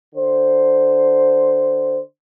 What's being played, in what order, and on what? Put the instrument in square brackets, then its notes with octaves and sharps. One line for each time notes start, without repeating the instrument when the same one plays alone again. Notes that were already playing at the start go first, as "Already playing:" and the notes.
[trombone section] D3 C5